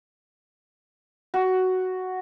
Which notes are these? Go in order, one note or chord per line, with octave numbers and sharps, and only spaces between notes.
F#4